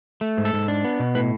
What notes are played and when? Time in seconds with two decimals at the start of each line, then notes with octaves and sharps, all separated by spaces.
0.21 A3
0.37 G#2
0.45 A4
0.53 G#2
0.68 D4
0.84 B3
1.00 B2
1.15 A2 B4